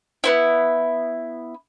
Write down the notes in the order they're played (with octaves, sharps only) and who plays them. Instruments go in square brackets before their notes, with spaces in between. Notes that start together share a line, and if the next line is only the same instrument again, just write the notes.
[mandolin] B3 C4 E4